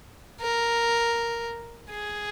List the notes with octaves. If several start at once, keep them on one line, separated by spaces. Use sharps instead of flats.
A#4
G#4